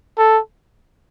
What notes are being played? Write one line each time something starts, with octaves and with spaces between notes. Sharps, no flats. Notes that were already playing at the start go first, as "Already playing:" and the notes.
A4